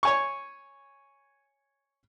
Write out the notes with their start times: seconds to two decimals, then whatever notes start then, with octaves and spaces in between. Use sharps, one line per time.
0.03 C#5 G#5 C#6